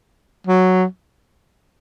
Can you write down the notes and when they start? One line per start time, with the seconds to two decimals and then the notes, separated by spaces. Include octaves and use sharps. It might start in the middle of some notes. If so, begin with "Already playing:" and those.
0.47 F#3